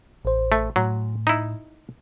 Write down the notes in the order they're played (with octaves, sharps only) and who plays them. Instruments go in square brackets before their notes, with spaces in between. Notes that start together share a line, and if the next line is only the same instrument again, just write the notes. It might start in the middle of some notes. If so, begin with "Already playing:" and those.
[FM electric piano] A1 C5
[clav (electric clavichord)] A3
[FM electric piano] A2 [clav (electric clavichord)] F#3
[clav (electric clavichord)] D#4 E4